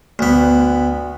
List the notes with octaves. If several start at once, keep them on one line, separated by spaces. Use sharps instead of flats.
D2 B3